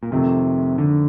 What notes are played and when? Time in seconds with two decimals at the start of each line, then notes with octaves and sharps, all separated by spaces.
0.03 A#2
0.12 F2 C3 D#3 A3
0.78 D3